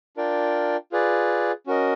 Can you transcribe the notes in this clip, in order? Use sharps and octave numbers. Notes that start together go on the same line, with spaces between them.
D4 F4 A#4 D5 G5
F4 G#4 B4 D5
C#4 F#4 A#4 D#5